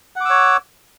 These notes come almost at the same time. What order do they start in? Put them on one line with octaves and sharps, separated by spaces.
F#5 D6 E6 C#5